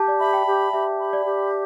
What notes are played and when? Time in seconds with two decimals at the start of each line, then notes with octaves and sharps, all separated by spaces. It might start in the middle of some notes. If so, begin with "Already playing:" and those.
Already playing: G4 A5
0.08 D5
0.19 E5 B5
0.33 G5
0.46 G4
0.73 G4 E5
0.99 B5
1.13 D5
1.26 G4